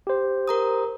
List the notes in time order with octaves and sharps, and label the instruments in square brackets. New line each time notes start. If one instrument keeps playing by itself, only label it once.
[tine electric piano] G4 C5
[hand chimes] A#4 A#5 D#6